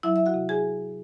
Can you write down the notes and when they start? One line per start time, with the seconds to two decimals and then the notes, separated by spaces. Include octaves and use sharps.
0.03 F#3 E4 E5
0.16 E5
0.26 F#4 F#5
0.34 C3
0.49 G#4 G#5